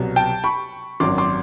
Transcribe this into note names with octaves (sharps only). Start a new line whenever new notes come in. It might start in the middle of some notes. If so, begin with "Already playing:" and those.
Already playing: C2 B2 F#3
G5 A5
B5 C#6
G#1 F#2 D#3 F#3 C6 D6
C6 D6